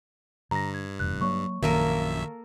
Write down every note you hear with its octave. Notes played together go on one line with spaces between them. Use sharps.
G2 D3 A#5 A#6
G#6
F1 E2 F#6
F#3 A#3 C#5 C#6
A#1 F#2 D#3 A#3 A4 A#4 E5